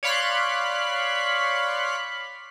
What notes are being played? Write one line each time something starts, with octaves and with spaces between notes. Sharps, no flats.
C#5 D5 F5 B5 C6 F#6